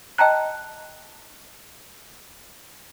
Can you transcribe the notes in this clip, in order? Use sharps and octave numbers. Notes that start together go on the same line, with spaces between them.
D#5 G5 A5 A#5 F#6